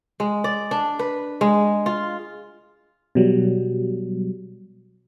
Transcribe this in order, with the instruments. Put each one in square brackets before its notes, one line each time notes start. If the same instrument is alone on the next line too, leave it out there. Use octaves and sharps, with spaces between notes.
[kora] G#3
D5
D4
B4
G#3
F4
[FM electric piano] B2 F#3 G3